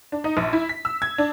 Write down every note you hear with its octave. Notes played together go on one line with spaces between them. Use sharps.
D4
D#4
A#1
E4
B6
E6
G#6
D4